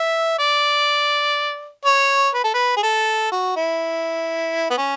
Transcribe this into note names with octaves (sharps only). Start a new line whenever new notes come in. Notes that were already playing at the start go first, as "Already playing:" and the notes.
Already playing: E5
D5
C#5
B4
A4
B4
G#4
A4
F#4
E4
B3
C#4